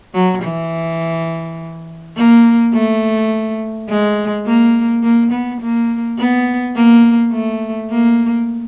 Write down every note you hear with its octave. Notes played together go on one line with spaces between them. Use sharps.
F#3
E3
A#3
A3
G#3
A#3
A#3
B3
A#3
B3
A#3
A3
A#3